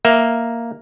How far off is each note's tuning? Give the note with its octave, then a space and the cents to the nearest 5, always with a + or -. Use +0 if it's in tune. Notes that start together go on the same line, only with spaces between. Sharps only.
A#3 +0 E5 +0